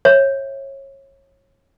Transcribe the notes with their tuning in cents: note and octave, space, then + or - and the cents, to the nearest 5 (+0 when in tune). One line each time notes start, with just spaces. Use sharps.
C#5 -25 E5 +0